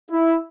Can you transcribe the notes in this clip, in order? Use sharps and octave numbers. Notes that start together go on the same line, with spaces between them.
E4